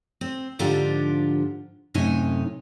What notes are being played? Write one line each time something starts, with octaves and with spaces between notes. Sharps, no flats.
C4
G#2 D3 F3 D4 F4 G4
F#2 A2 C3 D#4 C#5 G#5